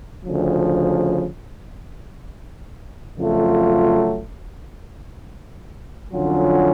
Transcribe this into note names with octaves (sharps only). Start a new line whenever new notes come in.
D2 C#3 F3
F2 C#3 F#3 A3 F4
F2 D3 F#3 C#4 F4